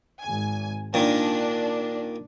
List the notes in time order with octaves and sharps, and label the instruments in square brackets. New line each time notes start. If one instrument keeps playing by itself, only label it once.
[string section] G#1 G#5
[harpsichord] A#2 D#3 [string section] D4